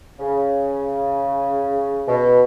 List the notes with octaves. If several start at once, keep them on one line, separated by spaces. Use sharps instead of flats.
C#3
B2